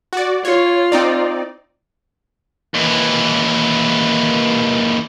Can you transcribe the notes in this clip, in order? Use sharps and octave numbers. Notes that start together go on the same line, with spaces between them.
F#4 D5
F4 C#5
C4 D#4 D5
D#2 E3